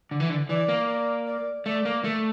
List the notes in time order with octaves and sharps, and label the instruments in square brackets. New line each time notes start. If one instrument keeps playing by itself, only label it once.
[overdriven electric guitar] D3
E3
D3
[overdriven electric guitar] E3 [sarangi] D5
[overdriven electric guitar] A#3
[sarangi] D5
D5
[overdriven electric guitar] A3 [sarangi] D5
[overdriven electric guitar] A#3
A3